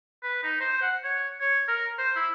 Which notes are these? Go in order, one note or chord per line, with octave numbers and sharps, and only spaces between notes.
B4
D#4
C5
F#5
C#5
C#5
A#4
C5
E4